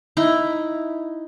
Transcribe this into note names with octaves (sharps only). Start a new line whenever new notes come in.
D#4 E4